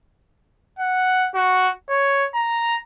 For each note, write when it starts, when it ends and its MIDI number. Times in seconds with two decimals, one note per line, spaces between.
0.79 1.29 78
1.35 1.70 66
1.89 2.26 73
2.34 2.76 82